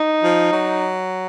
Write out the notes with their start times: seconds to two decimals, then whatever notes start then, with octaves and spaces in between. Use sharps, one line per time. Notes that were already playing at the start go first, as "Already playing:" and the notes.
Already playing: D#4
0.24 F3
0.53 F#3